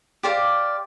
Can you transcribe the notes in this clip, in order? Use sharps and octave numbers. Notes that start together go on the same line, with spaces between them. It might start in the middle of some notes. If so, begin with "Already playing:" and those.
G4 C5 D5 F5